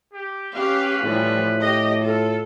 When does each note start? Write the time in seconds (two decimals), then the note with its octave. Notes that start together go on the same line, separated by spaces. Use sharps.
0.13 G4
0.56 C#4 G4 B4 F5
1.05 A2 E3 F3 G3
1.60 G4 D#5
2.01 F4 A4